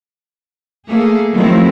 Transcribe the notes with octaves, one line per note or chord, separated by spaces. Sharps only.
A3 A#3 G#4
D#3 F3 F#3 A3 C4 E4